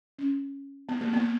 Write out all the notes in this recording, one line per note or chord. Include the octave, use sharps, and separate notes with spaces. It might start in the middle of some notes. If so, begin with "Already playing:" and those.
C#4
B3
A#3
B3